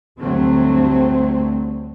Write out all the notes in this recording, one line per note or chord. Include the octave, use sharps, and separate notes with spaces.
D2 G2 D3 F#3 A3 C4